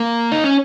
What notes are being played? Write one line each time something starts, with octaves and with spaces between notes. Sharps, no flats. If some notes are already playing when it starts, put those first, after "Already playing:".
Already playing: A#3
D#4
C#4